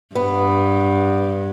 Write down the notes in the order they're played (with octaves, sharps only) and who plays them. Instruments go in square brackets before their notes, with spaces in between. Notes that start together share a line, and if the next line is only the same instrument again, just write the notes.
[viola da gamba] G2 [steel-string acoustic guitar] B3